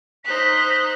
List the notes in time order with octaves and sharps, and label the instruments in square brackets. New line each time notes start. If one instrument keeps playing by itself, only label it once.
[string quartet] D#4 C5 F#6 [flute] B6